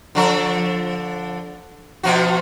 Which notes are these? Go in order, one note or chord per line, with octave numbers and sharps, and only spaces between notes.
D3 F3 A4
B2 F3 F#4